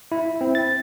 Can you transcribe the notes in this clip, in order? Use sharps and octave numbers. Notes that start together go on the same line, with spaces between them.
E4
C4
A6